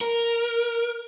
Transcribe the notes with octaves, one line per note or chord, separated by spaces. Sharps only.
A#4